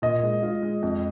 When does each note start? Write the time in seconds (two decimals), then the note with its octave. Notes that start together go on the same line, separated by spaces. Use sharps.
0.02 A#2 D#5
0.23 G#3
0.43 F4
0.62 G#3
0.82 F2 D#5